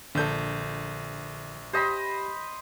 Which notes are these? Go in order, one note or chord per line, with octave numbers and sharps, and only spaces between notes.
A#1 D3 A4 G6
G4 C5 D#5 B5